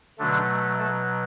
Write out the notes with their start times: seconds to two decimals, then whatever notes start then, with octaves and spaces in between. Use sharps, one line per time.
0.19 B2 D3 F#3 A3 D4
0.78 A3 A4